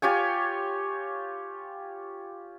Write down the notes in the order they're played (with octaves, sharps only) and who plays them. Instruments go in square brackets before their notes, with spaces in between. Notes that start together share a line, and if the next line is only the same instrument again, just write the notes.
[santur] F4 G4 C#5 G#5